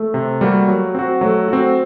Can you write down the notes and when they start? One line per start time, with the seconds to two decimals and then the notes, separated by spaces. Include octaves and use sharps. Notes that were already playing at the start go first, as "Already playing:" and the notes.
Already playing: A3
0.14 C3
0.41 G3 A#3 F#4
0.68 F#3
0.95 C4 F#4
1.21 F#3 A3
1.48 C4 F#4